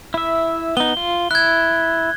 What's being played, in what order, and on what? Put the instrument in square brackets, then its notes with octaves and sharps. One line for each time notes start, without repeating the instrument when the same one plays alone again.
[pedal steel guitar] E4 E5
[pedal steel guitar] B3 D#4 [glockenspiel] G7
[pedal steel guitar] F4
[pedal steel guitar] E4 [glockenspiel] F#6 G#6